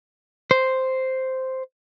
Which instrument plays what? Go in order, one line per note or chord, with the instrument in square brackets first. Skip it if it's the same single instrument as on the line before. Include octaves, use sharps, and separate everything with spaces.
[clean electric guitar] C5